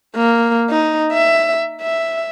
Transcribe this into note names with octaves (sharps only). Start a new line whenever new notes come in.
A#3
D#4
E5
E5